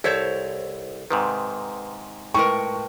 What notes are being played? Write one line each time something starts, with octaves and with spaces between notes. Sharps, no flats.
C2 E4 A4 C5 C#5
G#2 C3 D#3 B4
A2 G#3 A#4 B4 G5 C#6